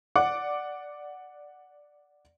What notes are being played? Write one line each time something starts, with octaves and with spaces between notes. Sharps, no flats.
D5 F#5 D6